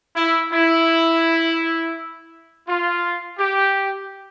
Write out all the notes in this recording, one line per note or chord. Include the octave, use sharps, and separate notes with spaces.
E4
E4
F4
G4